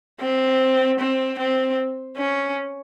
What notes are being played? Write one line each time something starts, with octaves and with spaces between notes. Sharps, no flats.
C4
C4
C4
C#4